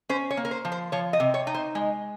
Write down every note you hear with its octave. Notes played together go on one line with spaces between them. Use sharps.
C#4 C5
C#5
A#3
A#4
C5
F3
C5
F3 C#5
D#5
C3
C#5
D#4
C5
G#3